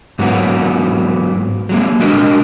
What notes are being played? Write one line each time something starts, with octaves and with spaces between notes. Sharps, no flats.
G#2 F#3 A#3 B3 F#4
F#3 G#3 A#3
G#3 D4 F#4 A#4 D#5